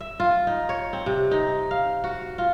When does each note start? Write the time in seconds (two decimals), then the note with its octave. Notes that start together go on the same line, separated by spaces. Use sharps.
0.01 E5
0.20 F4
0.47 D#4
0.69 C#5
0.93 C4
1.06 C3
1.31 D#4
1.71 F5
2.04 F#4
2.38 F4